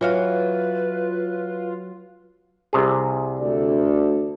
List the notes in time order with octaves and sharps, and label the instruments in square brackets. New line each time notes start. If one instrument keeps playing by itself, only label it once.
[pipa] E3 F#4 F5 [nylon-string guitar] F#3 [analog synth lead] F4 [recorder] B4
[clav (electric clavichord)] C2 C3 G#4
[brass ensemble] D2 A4 D5